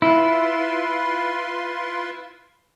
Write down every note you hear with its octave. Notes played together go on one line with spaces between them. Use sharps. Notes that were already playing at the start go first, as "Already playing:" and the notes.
E4 F4 B4 C6